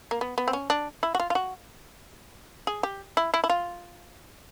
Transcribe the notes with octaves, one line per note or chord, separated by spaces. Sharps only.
A#3
B3
B3
C4
C#4
D4
E4
F#4
F4
F4
F#4
G#4
G4
E4
E4
E4
F4